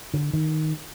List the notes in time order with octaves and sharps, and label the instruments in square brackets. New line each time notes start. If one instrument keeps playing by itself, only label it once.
[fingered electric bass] D3
D#3